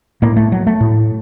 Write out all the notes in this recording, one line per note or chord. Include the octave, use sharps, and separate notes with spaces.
A2 A#3
A3
F#3
A3
A2